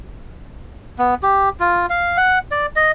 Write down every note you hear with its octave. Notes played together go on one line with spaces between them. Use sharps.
B3
G4
F4
F5
F#5
D5
D#5